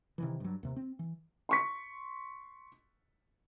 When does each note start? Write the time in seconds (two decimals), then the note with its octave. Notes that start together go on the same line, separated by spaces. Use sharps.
0.18 C3 D#3 E3
0.40 G2 F#3
0.63 D#2 C3
0.76 C4
0.99 E3
1.49 C6 C#6 B6